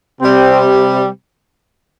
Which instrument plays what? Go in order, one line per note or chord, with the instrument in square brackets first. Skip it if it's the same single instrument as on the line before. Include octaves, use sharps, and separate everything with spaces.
[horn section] C3 G3 C4